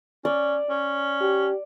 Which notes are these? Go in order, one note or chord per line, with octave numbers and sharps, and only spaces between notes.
C#4 D5
C#4
G4